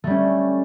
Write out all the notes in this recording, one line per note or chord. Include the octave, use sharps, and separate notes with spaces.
G3 A3 C#4